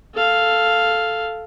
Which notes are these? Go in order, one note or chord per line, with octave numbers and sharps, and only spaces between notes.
A4 F5